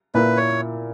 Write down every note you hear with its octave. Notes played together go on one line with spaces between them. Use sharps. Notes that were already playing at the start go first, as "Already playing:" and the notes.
A#2 A#3 E4 B4
C#5